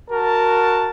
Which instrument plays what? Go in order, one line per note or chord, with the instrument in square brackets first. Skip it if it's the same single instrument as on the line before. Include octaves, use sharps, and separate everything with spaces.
[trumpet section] F#4 A5 [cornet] A#4